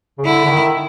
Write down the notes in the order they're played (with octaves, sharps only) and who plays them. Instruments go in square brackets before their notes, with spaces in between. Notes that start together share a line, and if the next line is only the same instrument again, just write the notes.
[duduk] C#3
[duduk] D3 [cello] E4
[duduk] D3
D#3